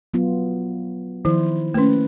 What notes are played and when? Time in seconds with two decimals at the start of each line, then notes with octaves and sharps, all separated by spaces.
0.14 F#3 B3 F4
1.25 D#3 F3 E4 C5
1.74 A3 A#3 C#4 B4